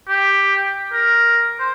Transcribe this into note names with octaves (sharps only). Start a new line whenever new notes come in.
G4
A#4
C5